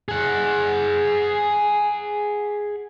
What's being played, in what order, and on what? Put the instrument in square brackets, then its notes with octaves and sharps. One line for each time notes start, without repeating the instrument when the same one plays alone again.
[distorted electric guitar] G#4 F#5